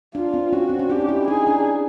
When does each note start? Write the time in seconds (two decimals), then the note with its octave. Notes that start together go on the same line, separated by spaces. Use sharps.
0.15 D4 F4
0.34 C4
0.53 C#4 F#4
0.69 C4
0.79 C#4
0.90 D4 G4
0.99 D#4
1.09 E4
1.28 D#4 G#4
1.47 D4